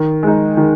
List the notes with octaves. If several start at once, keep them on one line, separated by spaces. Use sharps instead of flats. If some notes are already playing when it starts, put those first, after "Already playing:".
Already playing: D#3
G#3 D#4
D#3